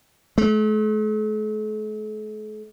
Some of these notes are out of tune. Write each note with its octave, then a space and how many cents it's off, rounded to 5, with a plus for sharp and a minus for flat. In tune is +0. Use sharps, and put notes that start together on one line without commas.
A3 -45